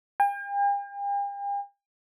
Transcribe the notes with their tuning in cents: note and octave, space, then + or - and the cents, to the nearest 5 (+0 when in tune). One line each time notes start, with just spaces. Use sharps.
G5 +45